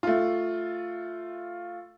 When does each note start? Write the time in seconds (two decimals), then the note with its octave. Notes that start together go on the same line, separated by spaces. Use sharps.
0.03 A3 F4